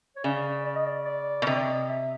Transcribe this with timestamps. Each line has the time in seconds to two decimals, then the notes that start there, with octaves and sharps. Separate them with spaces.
0.16 C#5
0.24 C#3 D5
0.65 D5
0.75 D#5
0.86 D5
1.05 D5
1.42 B2
1.47 C3 D#5
1.55 D5
1.61 D#5
1.89 E5